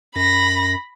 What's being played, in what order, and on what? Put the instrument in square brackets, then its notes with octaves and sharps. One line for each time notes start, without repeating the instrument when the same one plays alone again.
[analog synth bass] F#2 [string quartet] B5 A#6